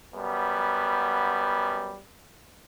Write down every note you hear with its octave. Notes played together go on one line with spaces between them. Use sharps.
F#2 G3 B3